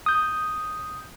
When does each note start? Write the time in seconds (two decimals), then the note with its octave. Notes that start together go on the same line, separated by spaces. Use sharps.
0.06 D#6 G6